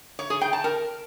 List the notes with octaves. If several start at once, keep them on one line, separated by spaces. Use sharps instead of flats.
C#5
G#4
G5
A5
A#4